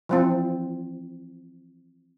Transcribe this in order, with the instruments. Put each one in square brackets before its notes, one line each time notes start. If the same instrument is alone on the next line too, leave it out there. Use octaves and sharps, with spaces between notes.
[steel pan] E3 F3 C4